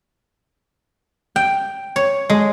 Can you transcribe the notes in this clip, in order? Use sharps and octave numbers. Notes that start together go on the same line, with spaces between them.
G5
C#5
G#3